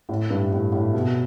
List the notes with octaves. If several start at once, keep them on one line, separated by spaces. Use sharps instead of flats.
A2
G2
A2
A2
B2